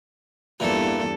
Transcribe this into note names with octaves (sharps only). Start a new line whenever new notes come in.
E2 G2 A#2 E3 A4